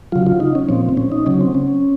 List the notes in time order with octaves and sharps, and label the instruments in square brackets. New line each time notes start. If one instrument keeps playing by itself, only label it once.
[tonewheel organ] C#3 F#3 F4
F4
D#4
C#4
A#2 F3 C4
C4
C#4
D#4
C#3 F#3 C#4
C4
C#4